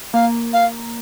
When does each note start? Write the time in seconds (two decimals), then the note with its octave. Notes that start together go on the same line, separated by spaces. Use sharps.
0.13 A#3 F5
0.53 F5